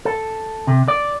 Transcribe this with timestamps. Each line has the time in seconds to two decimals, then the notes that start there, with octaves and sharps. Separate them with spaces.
0.05 A4
0.67 C3
0.88 D5